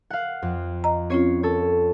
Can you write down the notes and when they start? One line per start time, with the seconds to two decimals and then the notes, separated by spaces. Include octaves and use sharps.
0.10 F5 F#5
0.42 F2
0.84 D#5 A#5
1.10 C4 C#4 F4 C#5 C7
1.43 A4 C#5